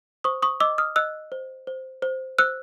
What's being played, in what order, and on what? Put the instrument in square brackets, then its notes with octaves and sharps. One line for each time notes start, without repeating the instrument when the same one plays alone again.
[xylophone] C5 C#6 D#6
C#6 D#6
D#5 D6 E6
D#6 F6
D#5 E6 F#6
C5
C5
C5
C5 E6 F#6